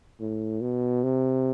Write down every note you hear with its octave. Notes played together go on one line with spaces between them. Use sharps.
A2
B2
C3